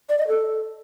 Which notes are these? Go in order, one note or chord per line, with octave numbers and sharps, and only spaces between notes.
D5
D#5
A4